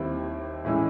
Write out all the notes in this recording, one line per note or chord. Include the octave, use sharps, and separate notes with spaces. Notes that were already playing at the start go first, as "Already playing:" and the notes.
Already playing: D#2 D#3 G3 C4 E4
A2 E3 G#3 C#4 E4